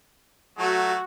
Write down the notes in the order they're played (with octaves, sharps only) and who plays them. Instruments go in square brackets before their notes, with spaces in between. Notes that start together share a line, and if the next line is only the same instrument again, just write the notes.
[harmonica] F#3 A3 [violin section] F#4